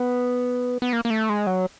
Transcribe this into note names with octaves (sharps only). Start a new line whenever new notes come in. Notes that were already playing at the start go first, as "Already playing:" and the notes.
Already playing: B3
B3
A#3
A#3
A3
G#3
F#3